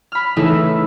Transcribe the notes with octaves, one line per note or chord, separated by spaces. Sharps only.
B5 F6
C#3 E3 A3 D#4 E4 B4